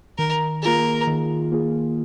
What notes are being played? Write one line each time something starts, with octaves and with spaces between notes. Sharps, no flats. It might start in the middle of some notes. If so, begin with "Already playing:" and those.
D#3 A#4
A#3 F4 G#4 A#4
D#3
A#3 F4 G#4